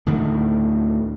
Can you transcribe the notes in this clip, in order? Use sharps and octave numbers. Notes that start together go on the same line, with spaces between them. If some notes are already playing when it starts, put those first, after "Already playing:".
D2 A2 D#3